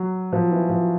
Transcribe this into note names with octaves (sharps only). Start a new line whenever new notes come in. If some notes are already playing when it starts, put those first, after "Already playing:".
Already playing: F#3
F3
E3
F3